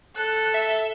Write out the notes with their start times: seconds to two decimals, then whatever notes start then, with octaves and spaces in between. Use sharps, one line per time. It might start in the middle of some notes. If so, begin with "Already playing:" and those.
0.16 A4 F#6
0.54 E5